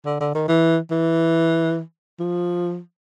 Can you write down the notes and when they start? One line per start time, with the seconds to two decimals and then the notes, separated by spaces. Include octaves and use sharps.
0.06 D3
0.20 D3
0.35 D#3
0.48 E3
0.91 E3
2.20 F3